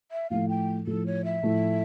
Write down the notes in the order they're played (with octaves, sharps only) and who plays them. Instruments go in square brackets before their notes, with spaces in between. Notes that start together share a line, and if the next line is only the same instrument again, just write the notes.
[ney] E5
[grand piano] A2 F3 A3 [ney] F5
[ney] G5
[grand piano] A2 F3 A3 [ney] A4
[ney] C#5
E5
[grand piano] A2 F3 A3